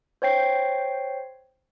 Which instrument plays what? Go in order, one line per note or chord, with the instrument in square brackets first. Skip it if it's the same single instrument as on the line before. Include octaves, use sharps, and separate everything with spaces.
[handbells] C5 C#5 G5 C7